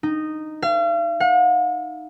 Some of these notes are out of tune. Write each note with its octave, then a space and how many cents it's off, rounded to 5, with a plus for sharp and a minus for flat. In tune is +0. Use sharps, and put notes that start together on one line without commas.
D#4 -10
F5 -40
F#5 -45